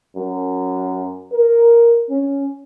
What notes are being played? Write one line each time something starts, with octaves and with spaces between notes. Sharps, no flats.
F#2
A#4
C#4